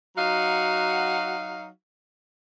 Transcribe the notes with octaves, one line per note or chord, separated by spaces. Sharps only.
F#3 D#4 F#4 F5